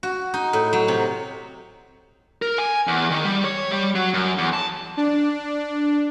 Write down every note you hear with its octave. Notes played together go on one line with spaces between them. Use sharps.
F#4
D#4
A2
F#3
C3
A#4
G#5
E2
D#3
G3
C#5
G3
F#3
F#2
E2
A5
D4